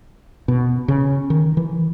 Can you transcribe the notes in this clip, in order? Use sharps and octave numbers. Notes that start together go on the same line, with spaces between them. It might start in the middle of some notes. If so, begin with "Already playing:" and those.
B2
C#3
D#3
E3